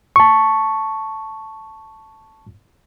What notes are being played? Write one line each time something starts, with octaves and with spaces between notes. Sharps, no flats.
A5 C#6